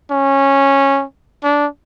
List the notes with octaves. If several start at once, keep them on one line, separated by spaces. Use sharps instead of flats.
C#4
D4